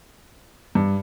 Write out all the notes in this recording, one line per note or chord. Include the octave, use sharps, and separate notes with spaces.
G2